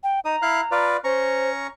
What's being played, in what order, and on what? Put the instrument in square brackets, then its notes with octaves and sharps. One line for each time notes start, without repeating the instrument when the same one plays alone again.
[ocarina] G5
[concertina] D#4 D#6 [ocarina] A#5
[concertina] E4 F5 F#6
F4 B4 D5
[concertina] C#4 A#5 C#6 [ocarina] C5